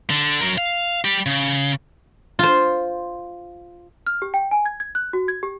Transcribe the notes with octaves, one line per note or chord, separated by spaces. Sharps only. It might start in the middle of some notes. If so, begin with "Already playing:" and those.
D3
F#3 A#4
F5
G3 G4
C#3
F4 C5
F6
G4
G5
G#5
G#6
G#6
F#6
F#4
G#6
G4